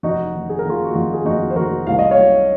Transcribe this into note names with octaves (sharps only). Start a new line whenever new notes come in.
F1 D#4 F#4
D#3
G#4
A#4
D#3 F4 G#4
F#4
F2 F4
G#4
F2 D#4 F#4
C5
F1 F#4 A#4
C2 F5
D#5
C#5 F5
F#3